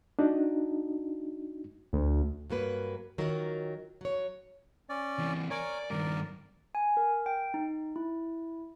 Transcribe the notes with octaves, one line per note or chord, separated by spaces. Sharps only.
D4 D#4 F#4
D2
G2 F#3 A#3 B4
D#3 F#3 F4 A#4
F#3 C#5
C#4 D5
E3 C4
A#4 C#5 D5 G#5
G2 D#3 A#4 D5
G#5
A#4
G5
D#4
E4